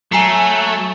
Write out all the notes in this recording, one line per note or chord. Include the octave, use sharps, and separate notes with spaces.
F#3 A3 G#5 A#5 C7